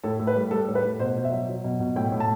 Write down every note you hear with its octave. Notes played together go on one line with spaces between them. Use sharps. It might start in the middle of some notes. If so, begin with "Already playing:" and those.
A2 A4
A2
B4
G3
G3 A4
A2
B4
A2
B2 C5
B2
E5
F#3
F#3
B2
B2
A2 G5
A2
A5